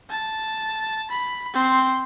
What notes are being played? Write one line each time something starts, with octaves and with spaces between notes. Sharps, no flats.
A5
B5
C4 C6